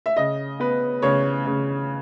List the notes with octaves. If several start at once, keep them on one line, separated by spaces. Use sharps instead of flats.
E5
C#3 D#5
B3 B4
C#3 C#5
C#3